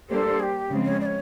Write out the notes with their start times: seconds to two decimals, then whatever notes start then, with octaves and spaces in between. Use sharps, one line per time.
0.09 G3 A#3 D4 G4 A4 C5
0.39 G#4
0.43 G4
0.71 C#3 F3 G#3 C4
0.85 C#5
1.01 D5
1.06 C#5